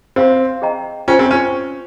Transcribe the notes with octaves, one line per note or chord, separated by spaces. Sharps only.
C4 C5 F5 C6
G#4 D#5 G5 A#5
C#4 F4 C5 G5
C4
C#4